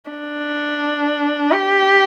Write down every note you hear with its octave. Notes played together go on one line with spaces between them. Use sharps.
D4
G4